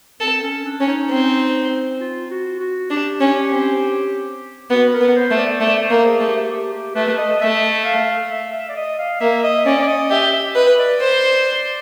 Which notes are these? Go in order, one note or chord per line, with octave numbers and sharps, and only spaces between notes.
C4 A4
C#4
D4
C#4
D#4
C4
F4
F#4
F#4
D4 G4
C#4
C4
B3 F#4
A#4
B3
C5
A3
D5
A3 D5
C5
A#3
G#4
A3
G4
G4
G4
A3 B4
D#5
A3 E5
F5
E5
E5
D5
D#5
F5
A#3 E5
D#5
C#4 D5
D5
D#5
G4 E5
E5
B4 D#5
D5
C5